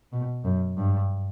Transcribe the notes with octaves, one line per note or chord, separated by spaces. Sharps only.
B2
F#2
G2